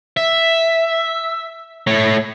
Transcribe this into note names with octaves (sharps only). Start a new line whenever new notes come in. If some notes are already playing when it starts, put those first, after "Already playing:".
E5
A3 C#5